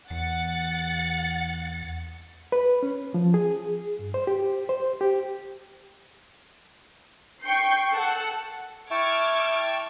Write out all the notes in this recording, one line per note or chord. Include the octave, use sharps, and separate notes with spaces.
E2 F#5 A6 C#7
B4
C#4
F3
G#4
G2
C5
G4
C5
G4
G5 C#6 G6 C7
A4 F#5
E4 G5 A5 C#6 D6 F6 G#6